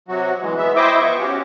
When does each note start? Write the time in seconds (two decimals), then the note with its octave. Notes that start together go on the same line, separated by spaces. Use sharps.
0.08 C3 F#3 F#4
0.42 E3 G#3
0.57 G#3 B3 E5
0.76 E4 C5 D#5 E5 G5 D6
0.99 F3 B3 C#6
1.18 C#4 F#4 G4